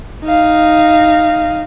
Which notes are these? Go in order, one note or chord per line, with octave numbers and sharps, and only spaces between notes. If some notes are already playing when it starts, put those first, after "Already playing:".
D#4 F5